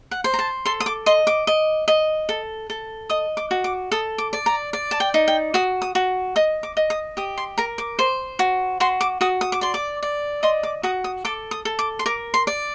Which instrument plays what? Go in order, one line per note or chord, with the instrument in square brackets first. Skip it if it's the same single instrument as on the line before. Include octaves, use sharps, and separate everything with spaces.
[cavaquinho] F#5
C5
A#5
A5
A4 C6
D#6
D6
D#5 C6
D6
D#5
D#5
A4
A4
D#5 D#6
D6
F#4
D6
A4 D#6
D6
D5
A#5
D5
A5
G5
D#4
G5
F#4 D#6
D#6
F#4
D#5 D#6
D6
D#5
D#6
G4 D#6
C6
A#4 A#5
D6
C5
F#4
F#4 C6
D6
F#4 D#6
D#6
D6
D5 C6
D6
D5
D#5 C6
D6
F#4 D#6
D#6
A4 D6
D#6
A4
D6
C6
A#4 D6
C6
D5